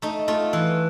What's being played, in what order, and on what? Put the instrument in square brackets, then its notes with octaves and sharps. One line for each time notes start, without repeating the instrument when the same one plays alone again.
[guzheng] A3 D#4
A3 F4
E3